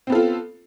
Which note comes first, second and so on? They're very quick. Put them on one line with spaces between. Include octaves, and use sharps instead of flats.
C4 B3 A4 F4